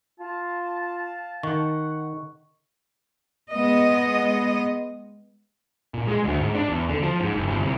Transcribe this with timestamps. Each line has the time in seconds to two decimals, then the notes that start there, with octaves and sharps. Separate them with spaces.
0.20 F4 F5 A5
1.43 D#3 F#5 C#6
3.51 G#3 B3 D#5
5.94 A#2
6.07 G#3
6.24 D2
6.39 G#2
6.55 D4
6.69 E2
6.90 D3
7.03 F3
7.20 G#2
7.34 F#1
7.48 G1
7.61 C2